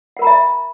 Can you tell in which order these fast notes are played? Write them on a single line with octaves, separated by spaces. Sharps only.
F#5 A#4 B5 A#5 E5